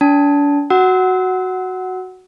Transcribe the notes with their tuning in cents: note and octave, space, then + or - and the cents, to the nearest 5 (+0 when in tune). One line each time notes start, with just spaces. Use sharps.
D4 -40 A5 +0
F#4 +0 F#5 +10 E6 -30